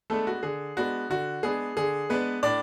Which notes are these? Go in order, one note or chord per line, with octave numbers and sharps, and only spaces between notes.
G#3 A3 B3 D4 A4
F#4
D3 G#4
G#3 B3 D4 F#4
D3 F#4
G#3 B3 D4 G#4
D3 G#4
G#3 B3 D4 B4
A2 D4 D5